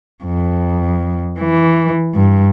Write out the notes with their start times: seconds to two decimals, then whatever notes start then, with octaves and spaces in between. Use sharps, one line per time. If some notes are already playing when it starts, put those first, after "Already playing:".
0.25 F2
1.40 E3
2.15 G2